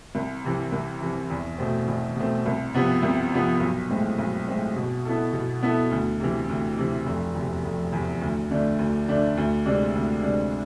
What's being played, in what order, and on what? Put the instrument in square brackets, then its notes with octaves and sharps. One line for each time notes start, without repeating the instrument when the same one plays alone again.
[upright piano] C2
C3 E3
C2
C3 E3
E2
B2 A3 C4
E2
B2 A3 C4
C2
C3 F3 B3
C2
C3 F3 B3
B1
A2 G#3 C4
B1
A2 G#3 C4
B2
B3 E4 A4
B2
B3 E4 A4
D2
C3 E3
D2
C3 E3
F1
E2 C3
F1
E2 C3
D2
D3 A3 D4
D2
D3 A3 D4
D2
C3 G#3 D4
D2
C3 G#3 D4